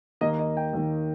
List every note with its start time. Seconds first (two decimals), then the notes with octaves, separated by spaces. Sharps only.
0.21 D#2 D#3 A#3 D#5
0.39 D#5
0.57 G5
0.73 D#2 D#3 A#3